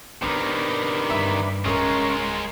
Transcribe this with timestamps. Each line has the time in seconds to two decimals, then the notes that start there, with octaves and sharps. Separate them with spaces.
0.22 C3 D#3 B3 C4 D4 B4 A#5
1.10 G2 E5 B5
1.65 D1 G#3 C#4 F4 A#4 D#6